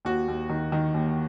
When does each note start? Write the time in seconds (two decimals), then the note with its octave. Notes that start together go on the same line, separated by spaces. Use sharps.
0.05 D#2 F#4
0.28 D#2
0.49 D#3
0.72 D#3
0.94 D#2